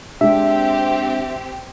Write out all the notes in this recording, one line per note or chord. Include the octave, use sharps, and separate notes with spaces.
G#3 C4 D4 G4 E5